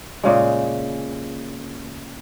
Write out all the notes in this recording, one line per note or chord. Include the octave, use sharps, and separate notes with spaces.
A#2 C#3 G#3